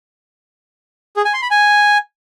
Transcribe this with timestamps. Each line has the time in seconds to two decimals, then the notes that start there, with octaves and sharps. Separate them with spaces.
1.16 G#4
1.25 G#5
1.34 C6
1.42 B5
1.51 G#5